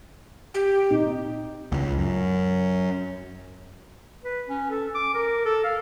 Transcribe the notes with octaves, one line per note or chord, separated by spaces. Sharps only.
G4
A#2 C4 D#4
C#2
F#2
B4
C#4
A4
D6
A#4
A4
F5